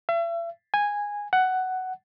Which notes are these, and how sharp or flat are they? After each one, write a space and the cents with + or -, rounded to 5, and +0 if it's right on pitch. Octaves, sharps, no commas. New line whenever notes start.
E5 +40
G#5 -10
F#5 +10